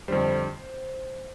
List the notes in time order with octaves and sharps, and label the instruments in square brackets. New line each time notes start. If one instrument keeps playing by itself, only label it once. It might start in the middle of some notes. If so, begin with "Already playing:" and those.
[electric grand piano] F2 D3 G3 C5